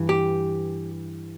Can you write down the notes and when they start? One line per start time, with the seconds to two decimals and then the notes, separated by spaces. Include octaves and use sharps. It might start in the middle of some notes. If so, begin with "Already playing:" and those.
Already playing: G2 E3
0.09 G4